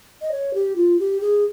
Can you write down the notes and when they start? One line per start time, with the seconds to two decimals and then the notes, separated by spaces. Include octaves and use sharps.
0.22 D#5
0.32 C#5
0.54 G4
0.76 F4
0.99 G4
1.21 G#4